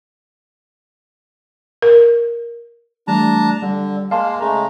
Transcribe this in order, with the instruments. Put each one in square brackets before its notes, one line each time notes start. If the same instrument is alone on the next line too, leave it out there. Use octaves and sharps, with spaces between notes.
[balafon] A#4
[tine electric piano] E3 G3 A3 [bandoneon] D4 A5 A#5
[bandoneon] D3 [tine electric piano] G3
[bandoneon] G#3 A#3 [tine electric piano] F5 A5 C6
[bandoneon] C#3 G#3 A3 [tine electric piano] A#5